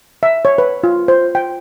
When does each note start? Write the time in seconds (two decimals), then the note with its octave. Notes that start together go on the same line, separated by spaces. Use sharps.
0.23 E5
0.45 C#5
0.58 B4
0.84 F4
1.08 C5
1.35 G5